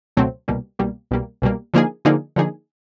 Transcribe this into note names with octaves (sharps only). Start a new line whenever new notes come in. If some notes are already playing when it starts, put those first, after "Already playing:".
C#2 B2 F#3 A3 C4
C2 B2 G3 A#3
C2 B2 G3 A#3
C2 B2 G3 A#3
C2 B2 G3 A#3
D3 F3 A#3 D#4 G#4
D3 F3 A#3 D#4 G#4
D3 F3 A#3 D#4 G#4